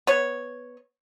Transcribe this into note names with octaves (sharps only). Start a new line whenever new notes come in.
B3 C#5